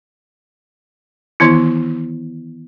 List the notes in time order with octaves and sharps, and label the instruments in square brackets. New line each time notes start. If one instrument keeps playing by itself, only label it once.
[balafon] D#3 E3 B3 E4